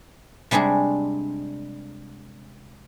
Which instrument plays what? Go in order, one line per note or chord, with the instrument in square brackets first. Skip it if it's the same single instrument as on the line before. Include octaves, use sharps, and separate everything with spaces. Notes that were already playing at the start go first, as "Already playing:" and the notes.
[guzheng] C3 G3 G#3 D4 G#4